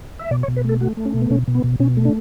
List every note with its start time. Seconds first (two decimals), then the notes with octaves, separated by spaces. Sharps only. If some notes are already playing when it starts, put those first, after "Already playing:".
0.19 E5
0.31 B2 D5
0.43 C#5
0.48 B2
0.57 B4
0.65 A3 A4
0.81 A3 F#4
0.97 A3
1.05 C#4
1.14 B2
1.22 B3
1.30 B2 C#4
1.48 B2
1.55 B3
1.64 B2
1.80 B2 C#4
1.97 A3
2.05 D4